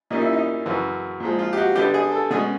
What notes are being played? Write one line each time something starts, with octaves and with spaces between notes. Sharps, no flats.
A#2 G3 A#3 C#4 D#4
E4
D#4
F#2 C#3 E3
A#2 F3 G#3
F4
G4
F#4
D3 G3 B3 G4
G#4
A4
B2 G#3 C#4 G#4